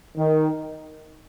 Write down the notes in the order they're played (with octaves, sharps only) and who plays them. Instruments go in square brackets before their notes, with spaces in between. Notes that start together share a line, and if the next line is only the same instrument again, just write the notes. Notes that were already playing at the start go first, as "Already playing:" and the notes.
[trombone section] D#3